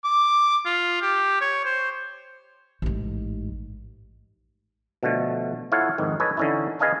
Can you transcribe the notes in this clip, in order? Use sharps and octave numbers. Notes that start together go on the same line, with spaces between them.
D6
F4
G4
C#5
C5
A1 G#2
B2 D3 F3 A3
E4 F4 A4 C#5 F5 F#5
F2 G#2 D#3
A4 B4 C#5 D#5 G#5
D3 E3 C#4 D#4 E4
G#4 B4 D#5 F5 G#5 A5